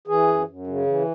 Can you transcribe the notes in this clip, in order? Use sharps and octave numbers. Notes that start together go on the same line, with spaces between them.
E3 G#4
F#2
F#2
C#3
E3